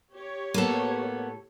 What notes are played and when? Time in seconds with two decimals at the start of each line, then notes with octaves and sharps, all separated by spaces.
0.13 G4 C#5
0.54 A2 A#3 B3 A4